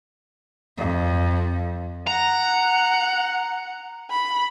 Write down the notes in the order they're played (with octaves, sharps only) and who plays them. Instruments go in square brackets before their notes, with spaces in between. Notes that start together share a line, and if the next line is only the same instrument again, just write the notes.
[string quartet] F2
[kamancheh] F#5 [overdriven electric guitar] A#5
[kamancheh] B5